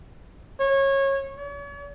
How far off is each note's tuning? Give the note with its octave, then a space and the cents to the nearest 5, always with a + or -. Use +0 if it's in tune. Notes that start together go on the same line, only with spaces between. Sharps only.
C#5 -20
C#5 +40